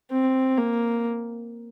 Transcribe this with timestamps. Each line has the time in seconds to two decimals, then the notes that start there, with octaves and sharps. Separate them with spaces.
0.11 C4
0.58 A#3